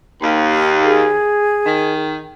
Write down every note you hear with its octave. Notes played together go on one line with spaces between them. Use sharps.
D#2
G#4
D#3